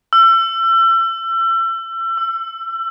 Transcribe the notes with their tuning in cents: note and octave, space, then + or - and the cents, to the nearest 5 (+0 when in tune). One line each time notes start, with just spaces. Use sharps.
E6 +35
E6 +15